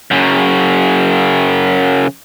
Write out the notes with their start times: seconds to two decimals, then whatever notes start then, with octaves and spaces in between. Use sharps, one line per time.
0.11 F#2 C#3